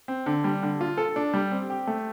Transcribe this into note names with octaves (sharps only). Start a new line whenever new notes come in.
C4
D3
G3
D3
F4
A4
D4
G3
C4
G4
A3